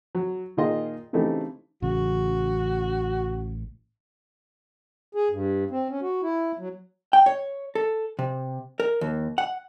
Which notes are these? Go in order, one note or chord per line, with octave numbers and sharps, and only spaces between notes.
F#3
A#2 D#3 F4 G#4 D#5 C6
C#3 E3 A3 C4 D#4 G4
A1 C#3 F#4
G#4
G2
C4
C#4
F#4
E4
F#3
G5
C#5
A4
C3
A#4
D#2
F#5